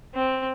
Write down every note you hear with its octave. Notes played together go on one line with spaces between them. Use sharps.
C4